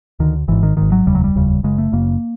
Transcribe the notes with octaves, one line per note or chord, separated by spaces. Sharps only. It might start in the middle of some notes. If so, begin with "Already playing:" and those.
D2 D3 D#3
G#1 G#2 E3
D#3
G#1 G#2 D#3
F#3
F1 D#2 C#3 G3
F#3
G3
F1 D#2 C#3
F#1 F#2 C#3 G#3
A3
F#1 F#2 C#3 A#3